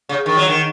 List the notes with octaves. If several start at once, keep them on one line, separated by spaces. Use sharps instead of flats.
C#3
D#3
F#3
D#3